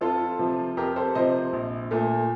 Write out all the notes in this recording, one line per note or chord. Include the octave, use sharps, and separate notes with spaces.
F2 F4 A4
C3 F3
F2 G4 A#4
A4 C5
C3 F3 C5 D#5
A#1
A#2 A3